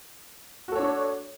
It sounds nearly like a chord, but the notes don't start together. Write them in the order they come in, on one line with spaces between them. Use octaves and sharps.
F#4 A4 C#5 D4